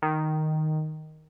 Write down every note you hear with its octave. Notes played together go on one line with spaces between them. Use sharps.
D#3